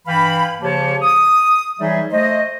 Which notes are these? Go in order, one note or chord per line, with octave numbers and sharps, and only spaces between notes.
G2 E3 F5 G5 B5
C#3 F3 A#3 G4 C#5 A5
D#6
E3 F#3 G3 D#4 G#4 E5
A3 C5 D#5